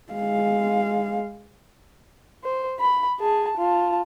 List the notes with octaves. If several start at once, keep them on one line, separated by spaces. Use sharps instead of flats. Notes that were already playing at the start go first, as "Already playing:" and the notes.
G#3 F5
C5
B5
G#4 A5
F4 A5